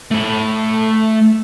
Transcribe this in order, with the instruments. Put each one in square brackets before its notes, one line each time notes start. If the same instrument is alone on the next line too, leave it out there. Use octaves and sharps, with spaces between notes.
[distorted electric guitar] A3 B5